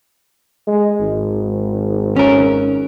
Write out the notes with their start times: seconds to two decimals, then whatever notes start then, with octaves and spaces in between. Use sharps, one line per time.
0.67 G#3
1.00 G#1
2.16 C#4 A#4